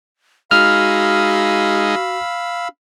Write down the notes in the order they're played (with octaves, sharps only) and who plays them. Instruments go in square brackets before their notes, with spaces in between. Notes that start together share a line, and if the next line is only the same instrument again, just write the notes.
[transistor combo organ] G#3 D#4 [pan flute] F#4 [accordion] F5 B5 E6 [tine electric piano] F6